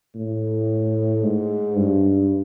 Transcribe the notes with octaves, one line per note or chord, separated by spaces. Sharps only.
A2
G#2
G2